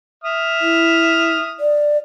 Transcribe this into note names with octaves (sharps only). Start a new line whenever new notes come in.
E5 D#6 F6
E4
D5